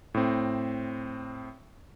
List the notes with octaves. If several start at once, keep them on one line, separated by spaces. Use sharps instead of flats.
A2 C4